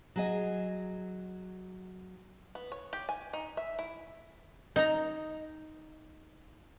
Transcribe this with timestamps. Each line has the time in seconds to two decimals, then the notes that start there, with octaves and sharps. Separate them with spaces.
0.16 F#3 G#4 D#5
2.55 B3
2.72 C#5
2.93 G4
3.09 G#5
3.33 D#4
3.57 E5
3.79 E4
4.76 D#4 A#5